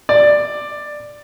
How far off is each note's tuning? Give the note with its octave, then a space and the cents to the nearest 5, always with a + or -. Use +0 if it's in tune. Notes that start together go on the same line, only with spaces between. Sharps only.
D5 +10